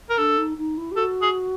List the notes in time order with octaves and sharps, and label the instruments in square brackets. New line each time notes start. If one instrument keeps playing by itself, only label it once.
[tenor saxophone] A#4
[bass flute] D4 [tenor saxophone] A4
[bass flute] D#4
D#4
E4
G4
[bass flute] F#4 [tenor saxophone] A4
[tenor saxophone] G#4